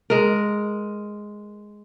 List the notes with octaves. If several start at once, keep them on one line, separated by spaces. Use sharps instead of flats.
G#3 A#4